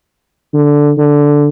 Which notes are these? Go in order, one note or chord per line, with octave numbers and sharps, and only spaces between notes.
D3
D3